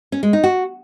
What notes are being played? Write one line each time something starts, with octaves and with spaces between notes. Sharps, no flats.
C#4
G#3
D#4
F#4